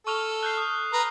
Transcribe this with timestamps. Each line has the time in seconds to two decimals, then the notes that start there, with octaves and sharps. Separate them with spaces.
0.07 A4 C#6 F6 F7
0.43 F#6 G6 C7
0.57 D#6
0.93 B4 A#5